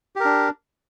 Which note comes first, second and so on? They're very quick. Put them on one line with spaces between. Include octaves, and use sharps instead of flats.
G4 A#4 D4